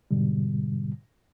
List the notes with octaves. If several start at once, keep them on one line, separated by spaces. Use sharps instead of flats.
G#2 B2 D3 G3